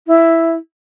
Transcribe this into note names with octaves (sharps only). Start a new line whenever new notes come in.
E4